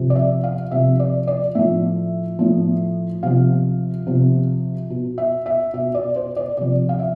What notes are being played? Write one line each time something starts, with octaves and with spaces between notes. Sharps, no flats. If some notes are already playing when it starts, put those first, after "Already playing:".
Already playing: C3 F3
D5
E5
F5
C3 F3 E5
D5
D5
A2 F3 E5
A2 F3
C3 F3 F5
C3 F3
B2
E5
E5
B2 E5
D5
C5
D5
C3 F3 D5
F5
E5